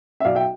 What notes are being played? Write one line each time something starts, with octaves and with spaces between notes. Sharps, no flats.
E5
B1 D5 F5
E5 G5